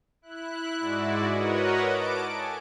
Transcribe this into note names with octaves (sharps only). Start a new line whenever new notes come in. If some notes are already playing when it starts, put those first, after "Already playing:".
E4 F#6
G#2 G#3 E4 F#4 D5
F#4 A#4 B4 C#5 D#5 F#5
A5 D6 D7
A4 G#5